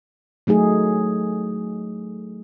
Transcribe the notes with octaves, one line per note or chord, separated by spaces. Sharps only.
F#3 A3 D#4 G#4